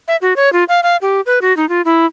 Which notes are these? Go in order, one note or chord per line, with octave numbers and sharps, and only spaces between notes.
E5
F#4
C#5
F4
F5
F5
G4
B4
F#4
D#4
F4
E4